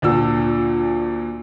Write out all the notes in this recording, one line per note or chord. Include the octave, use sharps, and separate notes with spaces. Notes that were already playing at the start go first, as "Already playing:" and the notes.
D2 A#2 E6